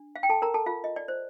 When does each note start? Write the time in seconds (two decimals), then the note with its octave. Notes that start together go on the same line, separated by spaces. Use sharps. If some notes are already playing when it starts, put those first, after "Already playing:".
Already playing: D4
0.16 F5
0.23 G5
0.29 A4 A5
0.42 A#4 A#5
0.54 A4 A5
0.66 F4 F5
0.84 D#5
0.96 D5
1.08 C5